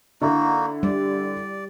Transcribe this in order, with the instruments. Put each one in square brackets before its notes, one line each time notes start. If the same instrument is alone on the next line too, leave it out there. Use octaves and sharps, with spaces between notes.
[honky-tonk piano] D3 E4 [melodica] A#3 D#4 F#4
[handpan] G3 [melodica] D5